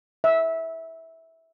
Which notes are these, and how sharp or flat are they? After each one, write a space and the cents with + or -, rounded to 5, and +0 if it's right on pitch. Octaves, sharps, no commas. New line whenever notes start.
E5 -15